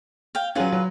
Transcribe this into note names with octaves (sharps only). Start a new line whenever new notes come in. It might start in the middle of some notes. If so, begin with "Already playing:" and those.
F5 G5
F#3 C#4 F4 G#4 B4
F#3